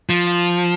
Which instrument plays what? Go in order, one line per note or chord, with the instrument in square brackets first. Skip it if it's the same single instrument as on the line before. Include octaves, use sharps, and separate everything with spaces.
[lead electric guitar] F3